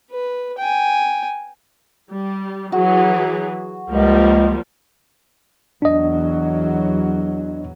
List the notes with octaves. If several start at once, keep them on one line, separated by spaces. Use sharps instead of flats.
B4
G5 G#5
G3
E3 F#3 F#4 G#4
C#2 F3 G3 A#3
E2 F#3 D4 D#5